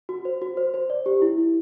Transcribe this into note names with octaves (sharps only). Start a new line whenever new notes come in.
F#4
C5
F#4
C5
C5
D5
G4
E4
E4